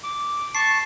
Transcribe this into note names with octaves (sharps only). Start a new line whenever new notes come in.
D6
A5 C#6 C7